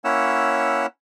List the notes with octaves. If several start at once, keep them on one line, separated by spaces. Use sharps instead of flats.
A#3 C#4 E4 C#5 F#5 E6